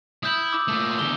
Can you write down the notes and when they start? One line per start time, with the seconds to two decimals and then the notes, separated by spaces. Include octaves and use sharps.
0.23 E4 D#6 G6 F#7
0.52 D6 E6
0.68 A#2 A3
0.99 E2 D3 G7